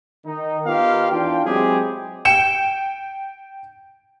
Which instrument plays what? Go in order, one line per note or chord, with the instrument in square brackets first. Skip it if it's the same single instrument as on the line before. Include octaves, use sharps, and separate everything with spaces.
[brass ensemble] D#3 D#4
B3 D#4 F4 G4 A#4 F5
E2 D4 F4 G5
F#3 G#3 C4 E4 G4 G#4
[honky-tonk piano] G5 C#7 E7